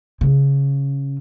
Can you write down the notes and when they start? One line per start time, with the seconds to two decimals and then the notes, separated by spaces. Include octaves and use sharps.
0.21 C#3